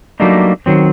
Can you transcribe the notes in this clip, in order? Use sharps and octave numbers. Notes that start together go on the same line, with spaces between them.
F#3 G3 A3 A#3 D4 D#4
D#3 F#3 C4